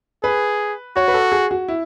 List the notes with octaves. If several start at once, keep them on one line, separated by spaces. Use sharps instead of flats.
G#4 B4
F#4 C#5
B4
A4
G#4
F#4
E4